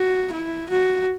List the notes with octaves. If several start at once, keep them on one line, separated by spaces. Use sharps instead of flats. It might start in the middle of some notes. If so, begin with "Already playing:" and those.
Already playing: F#4
E4
F#4